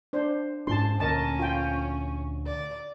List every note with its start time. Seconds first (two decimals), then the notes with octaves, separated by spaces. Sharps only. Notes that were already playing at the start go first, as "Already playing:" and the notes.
0.13 D4 C5
0.67 G#2 C#4 A5 C6
1.00 D2 A#2 D3 C#4 A#4 D#5 A5
1.39 F4 G5
2.47 D5